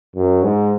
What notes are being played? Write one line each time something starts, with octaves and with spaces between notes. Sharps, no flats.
F#2
G#2